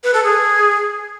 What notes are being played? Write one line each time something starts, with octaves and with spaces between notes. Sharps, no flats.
B4
A4
G#4